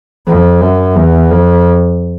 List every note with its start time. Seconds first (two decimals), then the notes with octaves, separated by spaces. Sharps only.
0.27 F2
0.61 F#2
0.96 E2
1.31 F2